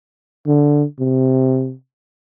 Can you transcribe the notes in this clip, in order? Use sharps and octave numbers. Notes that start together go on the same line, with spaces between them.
D3
C3